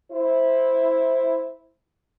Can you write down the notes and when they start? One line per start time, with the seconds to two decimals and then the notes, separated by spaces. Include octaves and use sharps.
0.12 E4 C5